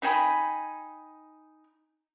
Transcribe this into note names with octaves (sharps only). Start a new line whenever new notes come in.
D#4 G5 G#5 B5